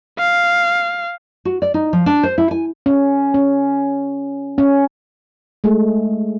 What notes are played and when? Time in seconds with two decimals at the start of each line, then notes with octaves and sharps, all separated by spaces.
0.19 F5
1.45 F#4
1.62 D5
1.74 D#4
1.93 F3
2.06 D4
2.23 C5
2.38 E4
2.51 G#5
2.86 C#4
3.34 C#4
4.58 C#4
5.64 G#3 A3 G#4